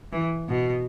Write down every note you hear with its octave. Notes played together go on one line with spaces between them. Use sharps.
E3
B2